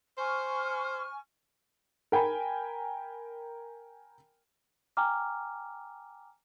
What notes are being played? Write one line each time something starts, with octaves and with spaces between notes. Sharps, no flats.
C5 G#5 C#6 F6
A#4 G5 G#5 B5
G5 G#5 A#5 D6 F6